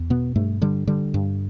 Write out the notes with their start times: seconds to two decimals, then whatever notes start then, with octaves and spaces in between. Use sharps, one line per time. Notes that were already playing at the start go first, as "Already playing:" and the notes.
Already playing: E2
0.10 B2 B3
0.35 G2 A3
0.62 D3 G3
0.87 D3 G3
1.14 G2